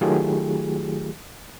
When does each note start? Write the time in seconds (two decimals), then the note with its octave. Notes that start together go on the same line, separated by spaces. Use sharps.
0.01 D#3 F#3 A3 F4 G4 G#4